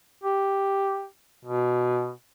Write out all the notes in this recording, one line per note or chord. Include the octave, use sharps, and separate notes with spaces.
G4
B2